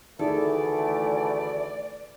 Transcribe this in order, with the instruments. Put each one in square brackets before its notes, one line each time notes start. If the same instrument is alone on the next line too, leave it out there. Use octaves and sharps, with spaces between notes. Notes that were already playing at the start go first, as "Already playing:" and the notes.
[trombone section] D2 E3 A3 [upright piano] D#3 E4 G#4 [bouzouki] A4 [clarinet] D5